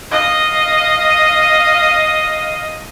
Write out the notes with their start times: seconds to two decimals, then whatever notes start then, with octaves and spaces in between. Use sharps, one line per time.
0.12 D#5 F5